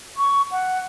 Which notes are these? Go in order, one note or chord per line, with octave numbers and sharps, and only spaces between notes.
C#6
F#5